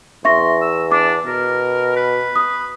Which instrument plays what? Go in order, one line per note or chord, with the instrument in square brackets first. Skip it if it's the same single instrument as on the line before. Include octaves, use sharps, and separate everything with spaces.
[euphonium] E2 [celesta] E5 C#6 A#6 [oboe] C6
[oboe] E6
[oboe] D4 [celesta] D6
[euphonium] B2 [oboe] A#4
[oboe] B4
[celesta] D#6